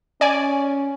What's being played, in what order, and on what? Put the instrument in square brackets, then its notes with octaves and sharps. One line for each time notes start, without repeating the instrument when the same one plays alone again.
[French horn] C#4 [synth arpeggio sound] D5 G#5